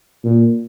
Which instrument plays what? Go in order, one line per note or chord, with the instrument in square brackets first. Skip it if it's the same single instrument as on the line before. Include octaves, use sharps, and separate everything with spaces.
[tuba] A#2